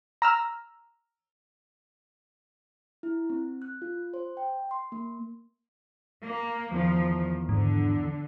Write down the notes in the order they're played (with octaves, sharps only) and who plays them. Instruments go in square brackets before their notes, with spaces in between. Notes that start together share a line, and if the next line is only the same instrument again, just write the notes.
[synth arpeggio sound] A#5 E6 F6
[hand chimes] E4
C4
F#6
F4
C5
G5
C6
A#3
[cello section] A#3
[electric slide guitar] E2 D#3 [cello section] F3
[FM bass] G#2 [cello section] D3